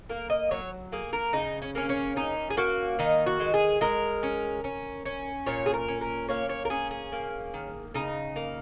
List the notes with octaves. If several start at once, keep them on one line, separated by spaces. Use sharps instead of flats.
A#3 A#4
D#5
F#3 C#5
A#3 G#4
A#4
C#3 D#4
C#4
A#3 C#4
C#4
C#4 D#4
G#4
A#3 F#4
D#3 D#4
F#4
G#3
G#4
G#3 A#4
C#4
C#4
C#4
A#2 C#5
G#4
A#4
C#4
A#4
A#3 C#5
C#5
A#4
C#4 G#4
G#4
A#3
D#3
C#3 D#4
A#3